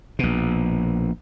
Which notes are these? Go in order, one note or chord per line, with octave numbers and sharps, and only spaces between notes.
A#1 B2